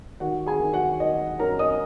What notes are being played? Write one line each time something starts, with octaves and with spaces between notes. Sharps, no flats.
D#3 F#4 F#5
G#4 G#5
D#3
F#4 F#5
D#3 D#5
F#2 A#4 A#5
D#5 D#6